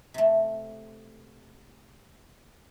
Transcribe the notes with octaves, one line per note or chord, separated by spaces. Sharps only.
C3 A3